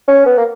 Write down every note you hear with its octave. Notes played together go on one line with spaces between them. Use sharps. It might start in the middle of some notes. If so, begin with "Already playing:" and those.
C#4
B3
A#3